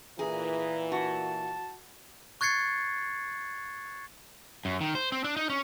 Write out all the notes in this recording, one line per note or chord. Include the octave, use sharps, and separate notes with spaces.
A#2 E3 G#4 A#5
F#4 A5
C#6 F#6 G#6 A6 C7 C#7
F#2
D#3
C5
C4
D4
D#4
C#4